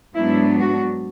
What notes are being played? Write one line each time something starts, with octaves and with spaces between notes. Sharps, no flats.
G#2 F#3 B3 D4 E4
F#4